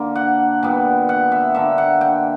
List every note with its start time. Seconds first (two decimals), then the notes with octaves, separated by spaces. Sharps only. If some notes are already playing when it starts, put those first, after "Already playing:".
Already playing: D3 A#3
0.16 F#5
0.63 A#2 G3 B3
1.09 F#5
1.32 E5
1.54 D3 A#3 E5
1.78 F#5
2.01 G5